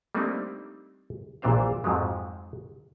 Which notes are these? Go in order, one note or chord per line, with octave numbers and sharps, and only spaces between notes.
G3 A3 A#3 C4 D4 D#4
A#1 A#2 E3 D4 C5 F5
F2 G#2 F3 F#3 G#3